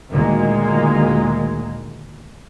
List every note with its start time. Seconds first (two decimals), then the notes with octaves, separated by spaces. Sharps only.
0.10 D2 A#2 D#3 F#3 G#3 A#3